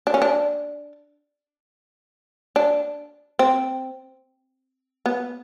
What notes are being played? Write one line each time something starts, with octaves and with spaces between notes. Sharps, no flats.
D4
C#4
D4
D4
C4
B3